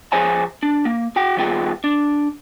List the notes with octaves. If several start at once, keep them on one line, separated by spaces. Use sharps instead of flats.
F3 G#4 C5 C#5 G#5 A#5
D4
A#3
F#4 F#5 G5
D#3 G3 B3 F4 G#4 G5
D4